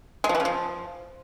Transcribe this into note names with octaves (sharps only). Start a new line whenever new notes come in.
G#3
F3
E3
C#3
F3